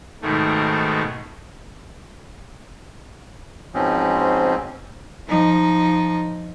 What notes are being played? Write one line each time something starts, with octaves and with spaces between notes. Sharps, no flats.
G#2 B2 D#3 A3
G#2 B2 F3 C4 C#4
F3 D#4